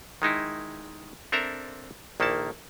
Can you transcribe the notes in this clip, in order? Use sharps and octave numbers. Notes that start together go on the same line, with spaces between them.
D#3 G#3 D#4 E4
C4 D4 A4 A#4 E5 A#5
A#1 D#3 A#3 E4 A4 A5